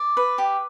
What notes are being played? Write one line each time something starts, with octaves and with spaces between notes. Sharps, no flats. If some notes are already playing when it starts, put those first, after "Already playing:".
Already playing: D5
B4
G4